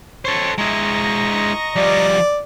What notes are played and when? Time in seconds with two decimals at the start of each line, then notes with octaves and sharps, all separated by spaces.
0.25 A4 C5 C#5 C#6
0.58 G#3 E4 D#5 A#5 C#6
1.76 F3 G3 D5